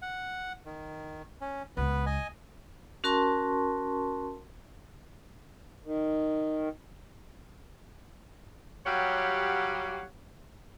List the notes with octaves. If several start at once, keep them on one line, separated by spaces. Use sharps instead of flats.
F#5
D#3
C#4
C#2 B3 B4
D#5 G#5
C#4 F#4 A#4 A5 C6 C#6
D#3
F#3 G3 G4 C#5 F5 F#5